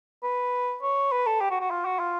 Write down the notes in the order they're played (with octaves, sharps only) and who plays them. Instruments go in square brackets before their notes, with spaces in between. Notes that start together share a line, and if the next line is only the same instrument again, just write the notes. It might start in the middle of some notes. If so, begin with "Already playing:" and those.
[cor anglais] B4
C#5
B4
A4
G4
F#4
F#4
F4
F#4
F4